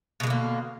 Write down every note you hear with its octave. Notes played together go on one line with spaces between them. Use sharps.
B2 D3 G#3 A#3